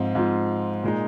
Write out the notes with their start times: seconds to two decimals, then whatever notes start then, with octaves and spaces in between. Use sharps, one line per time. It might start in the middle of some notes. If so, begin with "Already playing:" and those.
Already playing: G#2 F3 C4 F4
0.15 G#2 F3 C4 F4
0.84 A#2 G#3 D#4